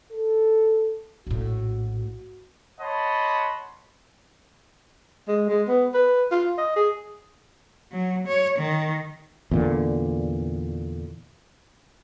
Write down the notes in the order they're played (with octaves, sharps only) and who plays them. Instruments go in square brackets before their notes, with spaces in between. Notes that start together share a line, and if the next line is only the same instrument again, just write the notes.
[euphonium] A4
[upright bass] A#1 A2 [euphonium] F#4
[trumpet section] C#5 D#5 F#5 A5 B5 C6
[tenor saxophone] G#3
G#3
B3
B4
F4
D#5
G#4
[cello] F#3
C#5
D#3
[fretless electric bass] E2 A#2 D3